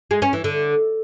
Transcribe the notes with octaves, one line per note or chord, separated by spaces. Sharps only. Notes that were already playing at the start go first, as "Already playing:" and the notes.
G#3
C#4
E3
D3